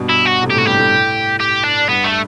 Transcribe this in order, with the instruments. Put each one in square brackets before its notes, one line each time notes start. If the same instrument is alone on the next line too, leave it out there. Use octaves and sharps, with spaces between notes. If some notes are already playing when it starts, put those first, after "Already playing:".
Already playing: [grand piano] G2 B2
[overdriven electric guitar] E4
F#4
[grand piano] A2 C3
[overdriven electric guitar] G4
[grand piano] A2 [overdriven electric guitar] F#4
[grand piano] G2 [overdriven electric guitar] G4
[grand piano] A2
[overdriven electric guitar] G4
D4
[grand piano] G2 [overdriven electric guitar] B3
[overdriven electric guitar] A3